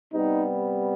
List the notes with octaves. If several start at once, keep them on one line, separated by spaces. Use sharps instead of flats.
C3 G3 B3 D#4